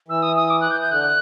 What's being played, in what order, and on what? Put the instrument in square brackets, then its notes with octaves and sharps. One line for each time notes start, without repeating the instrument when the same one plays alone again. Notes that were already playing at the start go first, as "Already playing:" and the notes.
[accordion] E3 [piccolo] E6
[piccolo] D#6
D#6
D6
F#6
G6
G6
[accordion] D3 [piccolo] F#6